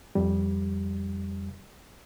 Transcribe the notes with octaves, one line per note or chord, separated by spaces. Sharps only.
F2 G3